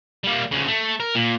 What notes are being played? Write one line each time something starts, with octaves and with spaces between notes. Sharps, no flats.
G3 A#3
D2 C#3
A3
A#4
A#2